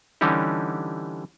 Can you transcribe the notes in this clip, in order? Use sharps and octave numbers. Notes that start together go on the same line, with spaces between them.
D3 E3 G3 C#4 D#4 G4